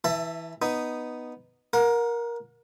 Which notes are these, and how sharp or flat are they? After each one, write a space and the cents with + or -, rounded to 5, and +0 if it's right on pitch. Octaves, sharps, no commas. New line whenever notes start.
E3 -10 E5 +20 A5 +15
B3 +0 D#4 -5
A#4 +15 F#5 -35